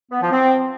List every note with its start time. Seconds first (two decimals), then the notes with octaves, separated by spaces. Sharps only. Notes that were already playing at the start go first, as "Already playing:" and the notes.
0.11 B3
0.21 F3
0.32 C4